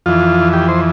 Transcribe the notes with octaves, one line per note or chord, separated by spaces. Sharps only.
F2 E3 F4
G4
C5